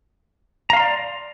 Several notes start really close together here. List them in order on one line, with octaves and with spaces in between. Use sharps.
A#5 F5 C6 D5